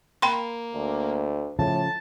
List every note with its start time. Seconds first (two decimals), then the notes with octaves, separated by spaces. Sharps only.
0.22 A#3 G5 B5 C6
0.74 D2
1.59 A2 C#3 F3 A5